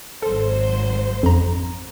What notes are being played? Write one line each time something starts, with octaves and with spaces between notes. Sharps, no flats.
G#1 F#3 A4 C5
F2 A#5